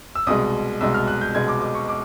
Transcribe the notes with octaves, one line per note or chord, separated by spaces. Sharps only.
E6
C2 B2 G#3 D#6
C2 B2 G#3 E6
F6
F#6
G6
C2 B2 G#3 G#6
D6
D6
C#6
D6